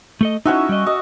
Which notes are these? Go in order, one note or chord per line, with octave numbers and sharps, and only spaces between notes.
A3 A4 D#5
C#4 D#4 E4 F#4 E5
G3 D#5
F#4 D#5